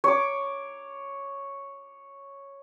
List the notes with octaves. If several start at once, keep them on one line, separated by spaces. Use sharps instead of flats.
C#5 D6